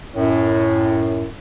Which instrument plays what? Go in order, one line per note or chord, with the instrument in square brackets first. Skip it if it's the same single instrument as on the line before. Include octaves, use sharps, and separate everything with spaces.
[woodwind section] F#2 A2